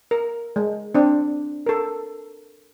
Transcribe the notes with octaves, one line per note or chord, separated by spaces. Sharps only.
A#4
G#3
C4 D4
A4 A#4